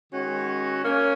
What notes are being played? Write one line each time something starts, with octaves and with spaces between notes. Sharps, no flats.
D#3 G#3 C#4 F#4
A#3 C#4